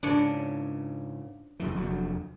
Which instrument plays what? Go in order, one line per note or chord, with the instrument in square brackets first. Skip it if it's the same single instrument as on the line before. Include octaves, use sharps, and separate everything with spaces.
[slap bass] G#2 C#3 [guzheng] D4 C#5
[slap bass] F#1 F#2 E3
F1 D2 F#3